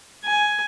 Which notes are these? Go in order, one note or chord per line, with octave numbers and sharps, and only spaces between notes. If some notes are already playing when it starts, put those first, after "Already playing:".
G#5